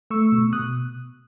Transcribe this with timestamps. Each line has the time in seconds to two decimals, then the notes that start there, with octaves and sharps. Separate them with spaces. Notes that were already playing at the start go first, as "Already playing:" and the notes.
0.10 A3 C#6 E6
0.32 B2
0.53 B2 D#6 F#6